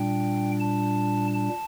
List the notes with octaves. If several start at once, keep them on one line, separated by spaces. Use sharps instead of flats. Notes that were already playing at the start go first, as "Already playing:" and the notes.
Already playing: A#2 G3 D4 G5
A5
A5